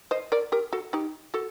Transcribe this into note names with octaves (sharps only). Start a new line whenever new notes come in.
C5 D#5
A#4 D5
G4 A#4
F#4 A4
D#4 G4
F#4 A4